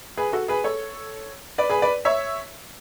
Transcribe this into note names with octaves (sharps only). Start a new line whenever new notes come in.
G#4 B4
F#4 A4
G#4 B4
A4 C#5
B4 D5
G#4 B4
B4 D5
C#5 E5